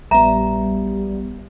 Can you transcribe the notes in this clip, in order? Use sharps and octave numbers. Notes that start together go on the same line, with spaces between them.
A#1 G3 B3 E5 A#5